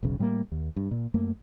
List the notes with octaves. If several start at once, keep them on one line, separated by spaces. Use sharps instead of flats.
E1 B1 C#3
A2 G3 G#3 A#3
D#2
G2
A#2
F#2 A3 A#3